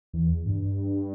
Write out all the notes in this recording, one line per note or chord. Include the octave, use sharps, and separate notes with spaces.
E2
G2